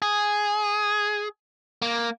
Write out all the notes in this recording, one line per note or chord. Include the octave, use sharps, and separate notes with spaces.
G#4
A#3